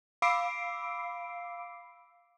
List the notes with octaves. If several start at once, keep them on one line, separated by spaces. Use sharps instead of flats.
F5 B5 D6 E6 C7 D7